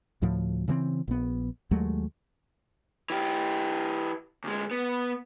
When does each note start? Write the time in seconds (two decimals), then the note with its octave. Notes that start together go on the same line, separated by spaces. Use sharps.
0.22 D2 A2 F3
0.68 C#3 E3 F#3 C4
1.08 A#1 B3
1.71 D#2 F#3 G#3 A3
3.10 E3 G4
4.44 D2 G#3
4.71 B3